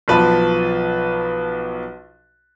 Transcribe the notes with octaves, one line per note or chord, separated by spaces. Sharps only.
B1 F3 B4 A5